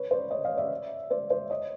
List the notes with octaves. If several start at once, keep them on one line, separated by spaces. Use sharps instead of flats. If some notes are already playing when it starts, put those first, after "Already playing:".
Already playing: B4 C#5
C5 D5
C#5 D#5
D#5 F5
D5 E5
C5 D5
C5 D5
C#5 D#5